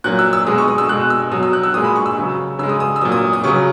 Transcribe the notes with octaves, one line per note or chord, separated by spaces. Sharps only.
A#2 F#3 F#6
E6
E6
B2 G#3 D#6
C#6
D#6
E6
B2 G#3 F#6
E6
B2 F#3 D#6
E6
F#6
E6
A#2 G#3 D#6
B5
C#6
E6
C#3 F#3
C#3 G#3 E6
D#6
D#6
E6
A#2 F#3 D#6
D#6
D#6
C#3 F#3 C#6